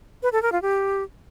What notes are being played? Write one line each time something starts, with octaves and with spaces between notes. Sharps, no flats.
B4
A4
A#4
F4
G4